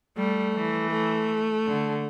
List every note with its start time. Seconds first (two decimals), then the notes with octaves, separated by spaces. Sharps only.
0.17 G3 A3
0.55 E3
0.92 A3
1.67 D3